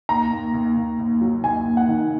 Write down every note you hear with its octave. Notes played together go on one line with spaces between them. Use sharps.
D#2 A#5
D#2
D#2
D#2
D#2
F#3
D#2 G#5
D#2
F#5
D#3